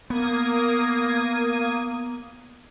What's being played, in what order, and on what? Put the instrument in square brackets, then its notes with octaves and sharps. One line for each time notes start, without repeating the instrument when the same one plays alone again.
[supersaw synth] A#3 D#6 G#6 [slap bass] B3